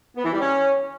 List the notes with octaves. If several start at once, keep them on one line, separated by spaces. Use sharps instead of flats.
B3
E3
G3
C#4